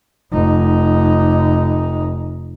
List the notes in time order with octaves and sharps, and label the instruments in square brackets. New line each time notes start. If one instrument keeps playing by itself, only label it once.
[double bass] F1 D#4